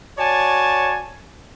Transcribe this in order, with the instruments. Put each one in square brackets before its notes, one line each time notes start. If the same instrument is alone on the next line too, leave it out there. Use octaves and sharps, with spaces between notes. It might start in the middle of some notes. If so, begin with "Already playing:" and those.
[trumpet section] F#4 C#5 D5 G#5 A5